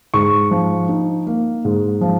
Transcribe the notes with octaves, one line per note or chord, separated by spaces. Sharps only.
G#2 C#6
F3
D#4
A#3
G#2
F3